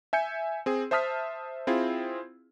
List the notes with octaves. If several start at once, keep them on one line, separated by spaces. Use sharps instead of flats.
E5 G#5 G6 C#7
C4 G#4
C5 E5 A5 D#6 F6 B6
C4 E4 F4 G#4